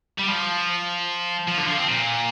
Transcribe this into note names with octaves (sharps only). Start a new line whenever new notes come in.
G3
F3
F3
D3
F3
C4
A#2